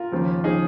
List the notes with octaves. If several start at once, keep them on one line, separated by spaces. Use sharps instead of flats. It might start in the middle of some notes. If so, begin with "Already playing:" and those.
Already playing: F4 A#4
D#2 C#3 F3
C#3 F3 D#4 G#4